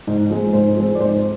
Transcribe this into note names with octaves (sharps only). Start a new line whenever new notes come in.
G#2
F3 G#3 C4
G#2 C5
F3 G#3 C4
D5
G#2 C5